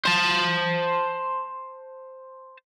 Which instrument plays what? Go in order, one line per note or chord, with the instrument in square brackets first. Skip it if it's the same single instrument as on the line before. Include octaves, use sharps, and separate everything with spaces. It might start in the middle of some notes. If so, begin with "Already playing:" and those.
[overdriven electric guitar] C5 A5